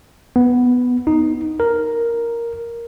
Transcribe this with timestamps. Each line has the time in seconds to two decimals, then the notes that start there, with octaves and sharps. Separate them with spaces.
0.36 B3
1.07 D#4
1.60 A#4